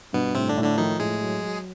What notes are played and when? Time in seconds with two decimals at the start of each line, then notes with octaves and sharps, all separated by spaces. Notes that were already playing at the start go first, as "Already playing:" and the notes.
0.13 G2 B2 B3
0.35 A2 C3 C4
0.49 D3 D4
0.57 A2
0.63 D3 D4
0.77 D#3 F3 D#4
1.00 A2 G#3 G#4
1.21 F#3
1.43 F#3